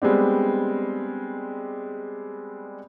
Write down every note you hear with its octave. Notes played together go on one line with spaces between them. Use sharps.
G3 G#3 B3 C4 D4